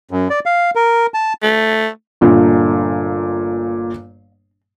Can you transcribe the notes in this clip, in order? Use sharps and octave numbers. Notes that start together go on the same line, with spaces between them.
F#2
D5
F5
A#4
A5
A3
G1 A#2